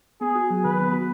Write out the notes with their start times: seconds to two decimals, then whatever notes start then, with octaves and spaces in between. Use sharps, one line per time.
0.21 B3 G#4
0.35 F#4
0.50 F#3
0.64 D#3 B4
0.79 B3
0.93 F#4